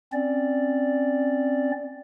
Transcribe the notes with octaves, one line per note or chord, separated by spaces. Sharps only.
C4 C#4 D5